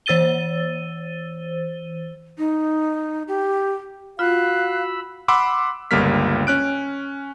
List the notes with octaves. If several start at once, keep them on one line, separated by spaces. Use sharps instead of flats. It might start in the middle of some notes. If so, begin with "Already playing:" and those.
E3 C5 E6 A6 D#7 G7
D#4
G4
F4 F#4 F5 B5 E6 F#6
F#5 B5 C6 D6 E6
G1 C#2 G3 A#3 F6 B6
C#4 F#6 D7